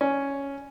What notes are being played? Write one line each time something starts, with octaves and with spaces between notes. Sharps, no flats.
C#4